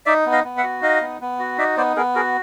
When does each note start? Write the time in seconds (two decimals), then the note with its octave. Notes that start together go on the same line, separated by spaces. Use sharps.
0.06 D#4 D5 E5
0.26 B3
0.32 D#5 F5
0.44 B3
0.57 E5 F#5
0.63 F#4
0.82 D#4 D#5 F5
1.01 B3
1.21 B3
1.39 F#4
1.58 D#4 D5 E5
1.77 B3 C5 D5
1.96 B3 G#4 A#4
2.15 F#4 G#4 A#4